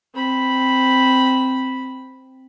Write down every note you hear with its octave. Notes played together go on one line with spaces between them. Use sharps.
C4 B5